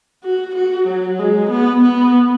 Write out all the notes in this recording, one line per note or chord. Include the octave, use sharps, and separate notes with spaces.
F#4
F#4
F#3
G#3
B3
B3